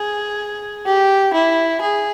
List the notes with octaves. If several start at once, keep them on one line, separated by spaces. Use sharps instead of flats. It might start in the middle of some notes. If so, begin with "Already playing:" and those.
Already playing: G#4
G4
E4
G#4